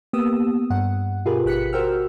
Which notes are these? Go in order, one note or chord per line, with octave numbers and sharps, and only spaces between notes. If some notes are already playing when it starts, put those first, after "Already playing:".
A#3 B3 G4 D#6 E6
G2 F#5
B2 F4 G4 G#4 A#4 B4
G#1 G4 F#6 B6 C#7
F#4 A#4 C5 G5 E6 F6